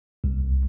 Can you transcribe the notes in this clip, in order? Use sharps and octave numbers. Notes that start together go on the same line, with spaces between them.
C2